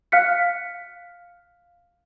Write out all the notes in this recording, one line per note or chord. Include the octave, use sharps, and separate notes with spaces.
F5 F6 F#6 B6 C#7